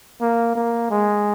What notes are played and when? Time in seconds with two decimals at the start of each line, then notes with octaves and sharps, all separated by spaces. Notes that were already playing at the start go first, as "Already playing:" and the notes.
0.21 A#3
0.55 A#3
0.90 G#3